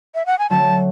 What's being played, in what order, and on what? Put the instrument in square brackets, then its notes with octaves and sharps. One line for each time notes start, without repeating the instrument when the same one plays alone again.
[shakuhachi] E5
F#5
G#5
[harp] D3 F#3 A3 C#4 [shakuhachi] A5